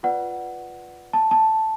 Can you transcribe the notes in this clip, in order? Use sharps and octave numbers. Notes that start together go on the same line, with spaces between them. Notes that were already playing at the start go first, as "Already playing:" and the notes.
F4 B4 D5 F#5
A5
A5